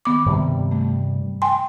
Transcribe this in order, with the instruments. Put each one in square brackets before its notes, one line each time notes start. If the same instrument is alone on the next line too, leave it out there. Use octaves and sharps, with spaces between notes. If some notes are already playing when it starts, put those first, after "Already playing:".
[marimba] D#3 B3 D6
[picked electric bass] G2 C3 G3
[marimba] A3
G5 G#5 C6